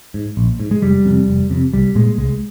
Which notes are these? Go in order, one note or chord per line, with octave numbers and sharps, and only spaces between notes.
G#2
A#1
G#2
G#3
F1 G3
F2 C3
F1
F2 C3
C2 G3
A#2 G#3
C2 G#3